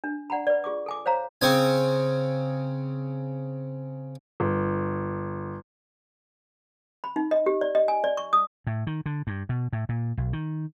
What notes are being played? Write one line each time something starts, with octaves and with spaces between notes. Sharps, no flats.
D4
D5 F#5 G#5 A#5 B5
B4 D5
F4 G#4 C#6 D6
A4 G#5 D6
C5 C#5 F5 A#5
C#3 C4 G#5
G1
B5
D#4
D#5
G4
D5
D#5
G#5
D5
C#6
D#6
A2
D#3
D3
G2
B2
A2
A#2
B1
D#3